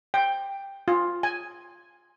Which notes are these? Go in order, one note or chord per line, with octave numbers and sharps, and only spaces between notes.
G5
F4
G#5